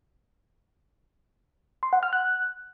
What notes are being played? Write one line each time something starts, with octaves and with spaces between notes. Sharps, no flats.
C6
F#5
F6
F#6